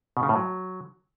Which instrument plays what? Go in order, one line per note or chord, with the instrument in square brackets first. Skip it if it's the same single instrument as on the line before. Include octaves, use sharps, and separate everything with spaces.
[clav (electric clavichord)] B2
C#3
A2
F#3